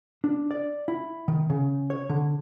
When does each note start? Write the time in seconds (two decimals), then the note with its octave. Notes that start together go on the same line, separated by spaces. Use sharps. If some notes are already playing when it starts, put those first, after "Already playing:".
0.24 D4
0.51 D5
0.88 E4
1.28 D#3
1.50 C#3
1.90 C#5
2.09 D3